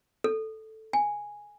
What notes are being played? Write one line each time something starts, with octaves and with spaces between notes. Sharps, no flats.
A4
G#5